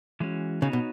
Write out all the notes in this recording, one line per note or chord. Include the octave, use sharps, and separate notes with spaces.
E3 G#3 C#4 F#4
C#3 B3 D#4 F#4 C#5
B2